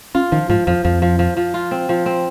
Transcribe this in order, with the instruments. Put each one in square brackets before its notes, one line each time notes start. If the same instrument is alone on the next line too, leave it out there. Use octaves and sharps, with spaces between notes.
[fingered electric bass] C#4 [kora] F4
[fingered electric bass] D#3 [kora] F3
[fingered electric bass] G#2 [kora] F3
[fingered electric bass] F2 [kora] F3
[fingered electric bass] F2 [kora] F3
[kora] F3
F3
F3
F4
C4
F3
C4